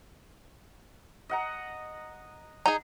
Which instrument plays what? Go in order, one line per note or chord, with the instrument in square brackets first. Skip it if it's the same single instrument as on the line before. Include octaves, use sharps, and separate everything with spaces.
[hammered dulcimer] D#5 F#5 A#5
[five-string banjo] D#4 G#4 [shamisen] A#5